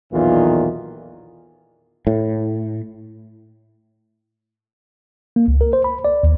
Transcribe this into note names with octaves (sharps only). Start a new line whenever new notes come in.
B1 E2 A#2 D#3 E3 F4
A2
A#3
C#2
A#4
C5
B5
D5
D#2